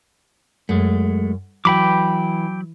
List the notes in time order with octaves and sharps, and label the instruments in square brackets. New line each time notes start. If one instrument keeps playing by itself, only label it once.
[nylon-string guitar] F#2 [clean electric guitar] G#3 A3
[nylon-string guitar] E3 [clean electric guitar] F#3 [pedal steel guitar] G5 B5 D6